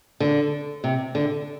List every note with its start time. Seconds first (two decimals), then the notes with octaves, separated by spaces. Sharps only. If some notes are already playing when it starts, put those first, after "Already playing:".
0.20 D3
0.84 C3
1.15 D3